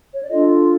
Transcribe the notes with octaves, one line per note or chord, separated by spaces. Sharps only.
C#5
D5
D4 F4 A4 D#5